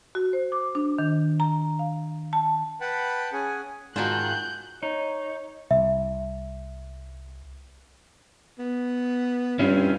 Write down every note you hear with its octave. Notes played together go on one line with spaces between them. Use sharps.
F#4
C5
D6
D4
D#3
A#5
F5
A5
B4 F#5 G5 A5 B5
C#4 G#4 F#5 G#5
G#2 D#3 F4 F#4 G#5 A5 F#6 G6
D#4 C#5
C2 E5
B3
G2 C4 C#4 E4 F4